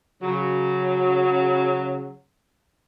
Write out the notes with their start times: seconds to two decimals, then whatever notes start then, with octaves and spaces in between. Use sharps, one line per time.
0.21 C#3 F#3